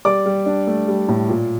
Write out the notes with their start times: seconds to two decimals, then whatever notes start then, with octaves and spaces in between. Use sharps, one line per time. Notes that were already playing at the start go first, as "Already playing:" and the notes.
0.05 G3 D5 D6
0.26 G3
0.46 D4
0.67 A3
0.88 G3
1.09 A2
1.29 A#2